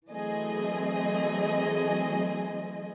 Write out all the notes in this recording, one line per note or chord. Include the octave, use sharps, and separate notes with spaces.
E3 F#3 A3 C4 G#4 D#5